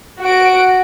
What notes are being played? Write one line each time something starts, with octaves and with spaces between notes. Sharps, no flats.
F#4 D7